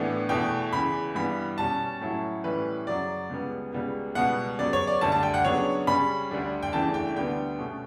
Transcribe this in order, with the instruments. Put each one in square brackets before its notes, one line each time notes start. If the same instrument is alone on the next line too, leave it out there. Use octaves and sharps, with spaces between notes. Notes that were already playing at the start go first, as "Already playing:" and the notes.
Already playing: [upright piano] A2 E3 B3 D4
E2 B2 A3 G5
E2 C#3 E3 B5
G2 E3 G3 B3 B5
B2 G3 C#4 A5
A2 F#3 C#4 E4
A2 E3 G3 C#4 E4 B4
F#2 C#3 F#3 D5
C#2 C#3 G3 B3
C#2 C#3 G3 B3
C#2 B2 G3 B3 F#5
C#3 F#3 B3 D5
C#5
D5
D2 D3 G3 D4 A5
A5
G5
F#5
C#3 F#3 B3 D4 C#5
C#3 G3 C#4 B5
D2 D3 G3 D4
G5
E2 C#3 E3 A3 D4 A5
G5
D2 D3 G3 B3 D4 G5
B2 A3 C#4